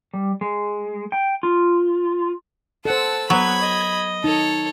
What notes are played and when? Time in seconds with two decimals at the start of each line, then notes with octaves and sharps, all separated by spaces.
0.14 G3
0.41 G#3
1.12 G5
1.43 F4
2.85 A4 C5 F#5 A5 E6
3.30 F#3 B3 B4 B5 G#6
3.60 D#5
4.24 D#4 A4 C#5